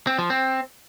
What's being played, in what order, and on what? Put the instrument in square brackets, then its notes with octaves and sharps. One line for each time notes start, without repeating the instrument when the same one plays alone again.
[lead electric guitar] C4
F3
C4